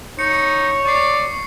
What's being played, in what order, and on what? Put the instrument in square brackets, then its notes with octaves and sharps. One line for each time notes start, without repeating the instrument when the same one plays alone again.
[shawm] D#4 [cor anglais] C#5 [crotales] C#7
[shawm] D5 [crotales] C#6 C7